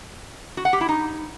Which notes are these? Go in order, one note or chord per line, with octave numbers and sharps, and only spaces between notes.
F#4
F#5
G4
E4
D#4